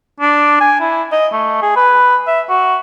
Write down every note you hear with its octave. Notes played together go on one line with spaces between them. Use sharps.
D4
G#5
E4
D#5
A3
G#4
B4
E5
F#4